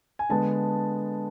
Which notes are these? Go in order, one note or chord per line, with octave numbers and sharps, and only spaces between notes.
G#5
D3 G#3 B3 A5